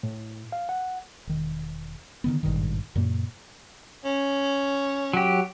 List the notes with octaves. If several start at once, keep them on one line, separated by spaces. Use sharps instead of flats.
A2
F5
F#5
E1 D#3
D3 D#3 B3
G#1 G2 A#2 D#3
F#2 A#2 C#3 A#3
C#4
F#3 G4